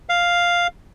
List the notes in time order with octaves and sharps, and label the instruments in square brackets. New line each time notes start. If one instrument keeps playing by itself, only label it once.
[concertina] F5